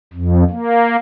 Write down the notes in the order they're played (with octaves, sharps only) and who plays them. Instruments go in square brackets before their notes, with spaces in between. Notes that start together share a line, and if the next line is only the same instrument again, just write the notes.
[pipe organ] F2
A#3